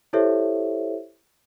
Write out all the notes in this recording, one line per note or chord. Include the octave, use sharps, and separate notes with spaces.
E4 G4 A4 C5 C#5 E5